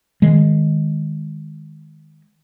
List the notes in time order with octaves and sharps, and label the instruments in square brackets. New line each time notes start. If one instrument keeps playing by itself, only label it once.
[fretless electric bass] D#3 G#3